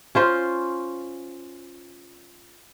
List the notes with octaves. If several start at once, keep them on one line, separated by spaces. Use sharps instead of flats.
C#4 F4 C5